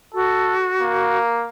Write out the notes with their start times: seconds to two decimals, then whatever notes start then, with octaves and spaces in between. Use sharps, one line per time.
0.14 F#4 A4
0.81 A#3